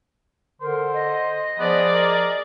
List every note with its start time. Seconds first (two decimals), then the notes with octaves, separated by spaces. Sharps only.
0.61 D3 A#4 C5
0.94 D#5
1.59 F3 B3 G#4 D5
1.92 A#4